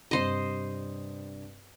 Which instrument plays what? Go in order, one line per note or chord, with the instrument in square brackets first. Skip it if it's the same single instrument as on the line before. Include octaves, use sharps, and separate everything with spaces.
[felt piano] G2 C3 [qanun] C5 D#5